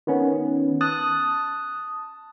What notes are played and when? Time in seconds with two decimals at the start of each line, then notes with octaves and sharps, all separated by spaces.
0.07 D#3 B3 C#4
0.81 A5 D#6 F#6